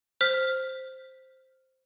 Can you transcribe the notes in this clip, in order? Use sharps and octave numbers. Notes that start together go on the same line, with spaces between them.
C5 F6 B6